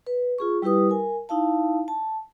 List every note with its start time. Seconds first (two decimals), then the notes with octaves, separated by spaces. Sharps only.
0.07 B4
0.38 F4 G#4 C#6
0.62 G3 E4 G4 B4 D#6
0.90 A#4 G#5
1.29 D#4 E4 F5 A5
1.88 A5